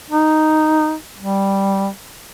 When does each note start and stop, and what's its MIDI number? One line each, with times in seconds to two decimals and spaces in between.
0.10 0.94 63
1.18 1.87 55